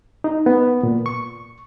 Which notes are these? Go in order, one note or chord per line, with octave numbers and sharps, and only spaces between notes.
D#4
B3
A#2
C#6